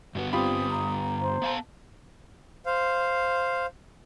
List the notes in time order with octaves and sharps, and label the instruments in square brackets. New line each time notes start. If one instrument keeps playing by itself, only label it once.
[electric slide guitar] G2 D3 B3 [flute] F#4
[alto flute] C4 [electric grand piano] F4 G4 B5 [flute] D#6
[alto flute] A#5
[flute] C5
[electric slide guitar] B3 F5 A5
[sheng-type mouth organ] C5 F5